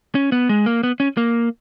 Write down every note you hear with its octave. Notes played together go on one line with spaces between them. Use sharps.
C#4
B3
G#3
A#3
B3
C#4
A#3